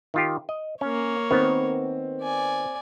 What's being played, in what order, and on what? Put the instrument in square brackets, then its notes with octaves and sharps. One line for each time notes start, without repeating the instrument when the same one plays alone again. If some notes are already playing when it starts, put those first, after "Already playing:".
[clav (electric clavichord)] D#3 F4 G4
D#5
[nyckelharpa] A#3 C#5 [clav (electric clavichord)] C#4
[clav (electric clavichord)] D#3 B3 [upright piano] C4
[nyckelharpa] D5 G#5